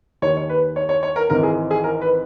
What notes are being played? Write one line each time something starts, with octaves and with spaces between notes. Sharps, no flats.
D#2 D#3 C#5
C#5
B4
C#5
C#5
C#5
A#4
G#1 G#2 E3 A#4
G#4
G#4
A#4
B4